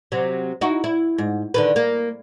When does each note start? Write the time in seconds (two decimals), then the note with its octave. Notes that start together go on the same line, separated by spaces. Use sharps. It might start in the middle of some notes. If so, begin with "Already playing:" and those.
0.12 C3 F#3
0.61 D#4 E4 F#4
0.84 E4
1.18 G#2
1.54 D3 D#3 B4
1.76 A#3